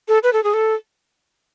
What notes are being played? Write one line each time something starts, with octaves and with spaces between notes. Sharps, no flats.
A4
B4
A4
G#4
A4